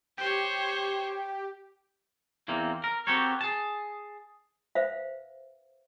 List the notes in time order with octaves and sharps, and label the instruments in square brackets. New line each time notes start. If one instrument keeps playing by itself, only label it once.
[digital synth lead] G4 [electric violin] C5 C#5
[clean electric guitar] E2 E3 A#3 C4
A#4
C4 F#4 G4 A4 A#4 C#5
G#4 A5
[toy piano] B4 C5 E5 F5